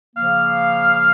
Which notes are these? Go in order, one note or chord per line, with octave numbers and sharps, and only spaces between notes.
C#3 F3 A#3 F5